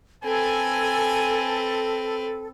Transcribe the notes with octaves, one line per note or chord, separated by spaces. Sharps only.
C4 A4 B4 G#5